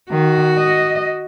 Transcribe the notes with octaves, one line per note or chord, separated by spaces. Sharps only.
D#3 F#4
D#5